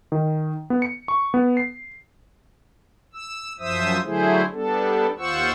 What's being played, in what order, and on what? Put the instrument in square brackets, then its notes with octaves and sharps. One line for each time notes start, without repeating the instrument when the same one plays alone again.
[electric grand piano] D#3
B3
C#7
C#6
B3
C7
[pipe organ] E6
F#2 F3 C5 E5 D#6 E6
D3 F#3 A3 E4 G#4 C5
G3 B3 D4 A4
D#2 F4 C5 F#5 C#6 E6